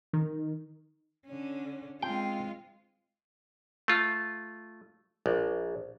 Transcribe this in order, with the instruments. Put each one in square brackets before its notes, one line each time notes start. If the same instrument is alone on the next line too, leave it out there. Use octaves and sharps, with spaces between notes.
[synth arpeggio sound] D#3
[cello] D3 C#4
[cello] G#3 F4 [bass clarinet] C4 [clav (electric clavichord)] G5
[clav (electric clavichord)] A3 F4
A#1